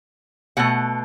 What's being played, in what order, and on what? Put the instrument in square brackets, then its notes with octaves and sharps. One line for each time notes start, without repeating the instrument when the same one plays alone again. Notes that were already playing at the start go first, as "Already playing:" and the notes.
[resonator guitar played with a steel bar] B2 A3 F#5